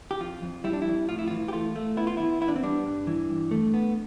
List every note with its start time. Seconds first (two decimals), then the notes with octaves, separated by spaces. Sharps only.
0.11 G4
0.21 F2 F4
0.42 F2
0.64 G3 E4
0.73 D4
0.82 F2 E4
1.09 A2 F4
1.19 E4
1.28 E3 F4
1.48 G4
1.53 A3 F4
1.76 A3
1.97 B3 E4
2.07 F4
2.17 E2 E4
2.41 B3 E4
2.48 D4
2.56 C4
2.63 G3 D4
2.86 G2
3.07 E3
3.30 G2
3.51 A3
3.74 B3